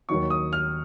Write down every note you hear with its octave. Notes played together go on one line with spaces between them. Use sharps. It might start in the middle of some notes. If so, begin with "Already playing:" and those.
D#2 D#3 F#3 C#6
D#6
F6